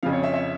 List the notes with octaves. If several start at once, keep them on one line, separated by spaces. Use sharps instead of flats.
F2 C#3 F3 F5
C#5
E5
E5